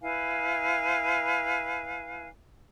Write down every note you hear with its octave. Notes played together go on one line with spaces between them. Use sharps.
E4 B4 F5 G#5